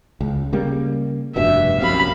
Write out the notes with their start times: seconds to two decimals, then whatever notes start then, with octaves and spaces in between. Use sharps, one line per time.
0.21 C#2
0.53 C#3 G3 A#3
1.36 F1 G2 B2 E5
1.80 A#1 F#2 C3 F5 B5